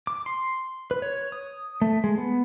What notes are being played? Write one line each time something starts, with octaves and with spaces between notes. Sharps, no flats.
D6
C6
B4
C#5
D#6
A3
G#3
B3